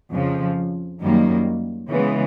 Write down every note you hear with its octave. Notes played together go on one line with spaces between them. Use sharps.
F2 C#3 F3
F#2 D#3 G3 A#3
C#3 E3 G#3 B3